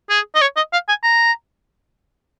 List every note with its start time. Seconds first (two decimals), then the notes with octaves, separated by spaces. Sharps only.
0.10 G#4
0.35 D#5
0.41 C#5
0.56 D#5
0.73 F5
0.88 G#5
1.03 A#5